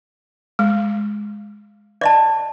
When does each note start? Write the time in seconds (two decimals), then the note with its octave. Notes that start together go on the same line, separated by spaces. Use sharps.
0.59 G#3
2.01 D5 D#5 A5